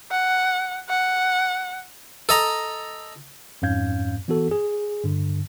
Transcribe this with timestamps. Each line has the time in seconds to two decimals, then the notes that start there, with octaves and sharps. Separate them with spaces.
0.11 F#5
0.89 F#5
2.29 A4 D#5 A#5
3.62 F2 G#2 C#4 F5 G6 G#6
4.28 E3 B3 F#4 A4
4.51 G#4
5.04 G2 D3